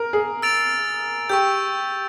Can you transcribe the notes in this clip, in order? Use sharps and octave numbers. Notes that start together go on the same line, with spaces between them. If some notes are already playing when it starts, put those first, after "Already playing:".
Already playing: A#4
G#4
E6 A6 D7 F7
G4 C#6 E6 G6